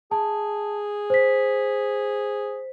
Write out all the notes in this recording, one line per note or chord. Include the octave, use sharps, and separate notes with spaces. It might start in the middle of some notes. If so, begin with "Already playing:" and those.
G#4 A5
C5 B6